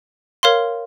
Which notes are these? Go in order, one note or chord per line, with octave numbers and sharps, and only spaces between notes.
A#4 C#5 F5 C6